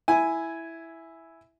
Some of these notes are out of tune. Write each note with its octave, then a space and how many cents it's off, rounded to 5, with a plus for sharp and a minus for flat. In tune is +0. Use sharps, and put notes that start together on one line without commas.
E4 +0 G#5 +0